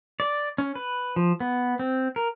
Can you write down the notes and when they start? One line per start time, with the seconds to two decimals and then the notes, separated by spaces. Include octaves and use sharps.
0.20 D5
0.58 C#4
0.75 B4
1.16 F3
1.40 B3
1.79 C4
2.16 A#4